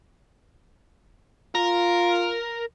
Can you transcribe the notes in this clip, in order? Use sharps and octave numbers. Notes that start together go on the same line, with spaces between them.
F4 A#4